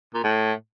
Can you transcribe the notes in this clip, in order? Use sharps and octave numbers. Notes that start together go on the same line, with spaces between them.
A#2
A2